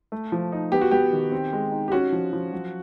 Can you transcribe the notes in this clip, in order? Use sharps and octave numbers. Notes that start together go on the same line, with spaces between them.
A3
F3
D#4
B3 G4
F#4
B3 G4
D#3
C4
G#3
D#4
G4
C#4 F#4
F3
F3
F#3